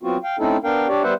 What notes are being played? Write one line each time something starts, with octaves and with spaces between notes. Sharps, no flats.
F#3 B3 C4 F4 F#4
F5 G5
A3 C4 C#4 D#4 E4 A4
B3 D4 A#4 F5 G5
D4 G4 C#5 D5
G3 B3 B4 C5 E5 F#5